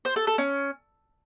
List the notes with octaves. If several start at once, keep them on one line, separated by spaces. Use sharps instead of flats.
C5
A4
A4
C#4